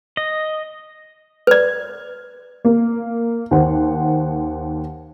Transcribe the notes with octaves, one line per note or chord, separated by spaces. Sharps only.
D#5
B4 D5
A#3
D#2 C5 F#5